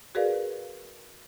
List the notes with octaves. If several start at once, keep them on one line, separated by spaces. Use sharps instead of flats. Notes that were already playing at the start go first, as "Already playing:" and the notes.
F#4 G#4 A#4 B4 D5 F5